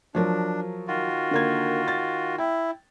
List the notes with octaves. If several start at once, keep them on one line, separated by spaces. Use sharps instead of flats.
F3 F#3 D4 A#4
D#3 F4 F#4
D3 A#3 G#6
A6
E4 G5